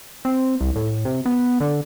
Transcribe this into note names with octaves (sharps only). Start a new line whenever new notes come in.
C4
C2
A2
C3
B3
D3